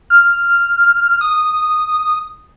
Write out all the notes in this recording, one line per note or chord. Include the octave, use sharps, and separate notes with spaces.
F6
D#6